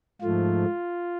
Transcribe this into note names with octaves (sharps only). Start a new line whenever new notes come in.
G#2 F3 A3 F4